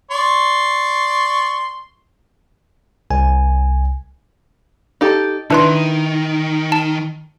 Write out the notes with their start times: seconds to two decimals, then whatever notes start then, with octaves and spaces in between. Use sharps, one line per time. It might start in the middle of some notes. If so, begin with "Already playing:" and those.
0.11 D5 C6 C#6
3.10 C2 G#5
5.01 D#4 G4 A4
5.50 D#3 D4 E4 B4 C6
6.72 A5